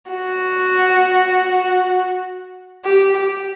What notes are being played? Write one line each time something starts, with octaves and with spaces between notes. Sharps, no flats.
F#4
G4
G4